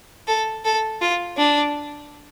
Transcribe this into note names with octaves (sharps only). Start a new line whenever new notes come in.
A4
A4
F4
D4